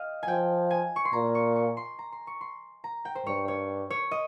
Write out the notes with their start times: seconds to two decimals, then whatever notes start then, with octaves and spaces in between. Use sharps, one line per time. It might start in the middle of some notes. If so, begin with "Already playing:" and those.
Already playing: D#5 F5 G5
0.23 G#5
0.28 F3 G5
0.71 G#5
0.96 C#6
1.05 C6
1.13 A#2 A#5
1.35 C#6
1.56 C#6
1.77 C6
1.99 A#5
2.12 C6
2.27 C#6
2.41 C6
2.84 A#5
3.05 G5
3.15 C5
3.26 G2 C#5
3.48 C#5
3.90 C#5
4.11 D#5